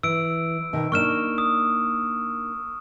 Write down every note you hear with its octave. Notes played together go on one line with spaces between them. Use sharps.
E3 E6 D7
B2 D#3
A#3 D4 D#4 C#6 F6 E7
D#6